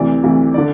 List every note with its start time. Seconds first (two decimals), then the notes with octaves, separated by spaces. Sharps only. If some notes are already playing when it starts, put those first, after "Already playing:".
Already playing: D2 C3 E3 D5
0.24 D2 C3 E3
0.54 D3 D5